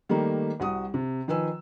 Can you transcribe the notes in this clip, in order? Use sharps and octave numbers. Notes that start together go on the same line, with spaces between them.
D#3 G3 A3 A#3
C2 F#4 D#6
C3
D#3 F3 B4 G#5 E6